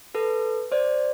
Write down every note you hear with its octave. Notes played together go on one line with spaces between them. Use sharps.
A4 B4
C5 D5